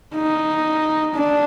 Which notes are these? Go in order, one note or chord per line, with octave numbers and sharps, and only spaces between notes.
D#4
D4